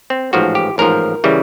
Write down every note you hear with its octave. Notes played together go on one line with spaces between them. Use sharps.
C4
A1 G#2 F3 F#4
G4
A1 G#2 F3 A#4
C#3 E3 G3